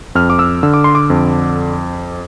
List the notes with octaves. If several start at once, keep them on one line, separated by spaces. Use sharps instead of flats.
F2 F6
D6
E6
D3 E6
D6
C6
D6
F2